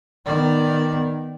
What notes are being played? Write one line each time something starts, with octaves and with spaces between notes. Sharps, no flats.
D#3 B3 D5